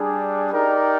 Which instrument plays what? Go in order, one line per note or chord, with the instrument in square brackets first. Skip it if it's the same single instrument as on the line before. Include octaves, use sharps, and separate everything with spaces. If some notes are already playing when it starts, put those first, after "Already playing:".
Already playing: [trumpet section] G3 D4 G#4
D#4 G4 A#4 D5